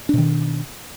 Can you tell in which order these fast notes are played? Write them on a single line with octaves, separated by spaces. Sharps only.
D4 B2 D#3